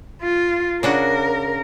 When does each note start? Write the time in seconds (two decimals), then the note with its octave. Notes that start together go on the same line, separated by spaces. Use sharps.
0.22 F4
0.83 C#3 D4 F#4 A#4